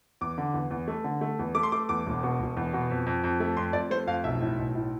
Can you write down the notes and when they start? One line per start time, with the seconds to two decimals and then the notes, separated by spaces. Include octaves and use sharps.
0.21 E2 D6
0.38 D3
0.54 E2
0.71 E2
0.88 A3
1.04 D3
1.21 A3
1.39 E2
1.55 A3 D6
1.63 C6
1.72 A3 D6
1.89 E2 D6
2.06 E1
2.23 B2
2.40 E1
2.57 E2
2.73 B2
2.90 F2
3.06 F2
3.24 F2
3.40 A3
3.57 F2 C6
3.73 F2 D5
3.90 A3 C5
4.07 F2 F5
4.24 B1 E5
4.41 A2
4.58 B1
4.75 A2